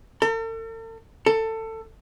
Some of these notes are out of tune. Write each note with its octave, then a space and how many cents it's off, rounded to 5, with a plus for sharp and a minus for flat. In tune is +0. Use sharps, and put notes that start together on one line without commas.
A4 +45
A4 +20